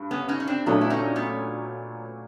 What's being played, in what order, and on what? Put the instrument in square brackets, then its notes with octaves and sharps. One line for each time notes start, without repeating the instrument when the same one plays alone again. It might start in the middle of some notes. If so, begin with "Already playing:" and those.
Already playing: [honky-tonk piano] G2
[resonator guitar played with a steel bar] B3 C#4
C#4 D#4
C#4
C4 D4
[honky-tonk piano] A#2 F#3 A3 D4 [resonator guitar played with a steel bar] B3 C#4
[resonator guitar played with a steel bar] E4
C#4 D#4
B3 C#4